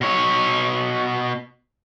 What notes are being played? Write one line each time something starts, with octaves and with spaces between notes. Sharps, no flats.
B2 C#5